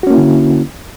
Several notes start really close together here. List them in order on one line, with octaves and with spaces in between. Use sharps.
F#4 C#4 A#3 E4 D3